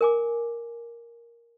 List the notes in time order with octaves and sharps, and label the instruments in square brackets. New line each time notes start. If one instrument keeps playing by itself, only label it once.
[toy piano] A#4 G#5 D6